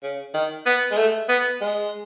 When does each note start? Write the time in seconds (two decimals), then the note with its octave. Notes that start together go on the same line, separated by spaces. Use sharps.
0.03 C#3
0.34 D#3
0.66 B3
0.91 G#3
0.98 A3
1.29 B3
1.61 G#3